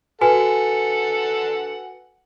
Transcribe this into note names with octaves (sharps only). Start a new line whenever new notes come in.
F#4 A4 B4 F#5 G#5